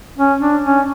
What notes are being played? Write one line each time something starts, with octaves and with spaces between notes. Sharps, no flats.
C#4
D4
C#4